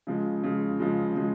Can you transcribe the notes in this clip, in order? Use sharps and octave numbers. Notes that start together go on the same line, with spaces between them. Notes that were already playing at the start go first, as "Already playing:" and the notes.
C#3 F3 G#3
C#3 F3 G#3
C#3 F3 G#3
C#3 F3 G#3